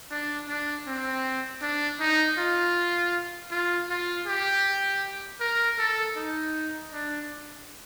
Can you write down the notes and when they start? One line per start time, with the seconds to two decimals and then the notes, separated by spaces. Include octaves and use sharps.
0.11 D4
0.48 D4
0.87 C4
1.62 D4
2.00 D#4
2.38 F4
3.51 F4
3.90 F4
4.27 G4
5.40 A#4
5.78 A4
6.16 D#4
6.93 D4